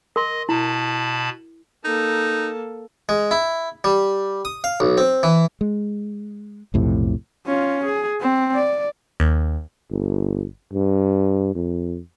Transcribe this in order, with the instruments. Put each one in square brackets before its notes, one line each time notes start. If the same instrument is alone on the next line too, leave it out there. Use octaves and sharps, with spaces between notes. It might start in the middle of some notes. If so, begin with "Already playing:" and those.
[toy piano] A#4 C6 [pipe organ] D#5
[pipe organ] B2 A5 B5 [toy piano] E4
[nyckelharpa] A#3 A4 [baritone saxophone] D#4
[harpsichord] G#3
E4
G3
D#6
F5
B1
C4
E3
[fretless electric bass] G#3
B1 F2 A2 C3
[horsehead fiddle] C#4 F4
G#4
C4
D5
[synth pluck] D#2
[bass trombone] G1
G2
F2